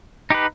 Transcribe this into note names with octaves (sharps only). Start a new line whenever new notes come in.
D#4 G4 B4